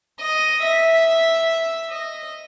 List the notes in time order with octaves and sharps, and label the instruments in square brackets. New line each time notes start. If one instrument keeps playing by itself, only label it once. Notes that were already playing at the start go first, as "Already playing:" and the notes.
[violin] D#5
E5
D#5